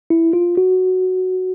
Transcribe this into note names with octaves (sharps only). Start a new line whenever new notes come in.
E4
F4
F#4